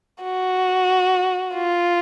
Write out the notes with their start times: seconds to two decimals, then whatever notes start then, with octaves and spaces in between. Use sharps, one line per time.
0.24 F#4
1.54 F4